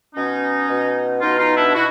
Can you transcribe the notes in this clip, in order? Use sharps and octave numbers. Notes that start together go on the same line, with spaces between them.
B2 C#4 D#4
B2
B2 D#4 F4
D#4 F4
D4 E4
B2 E4 F#4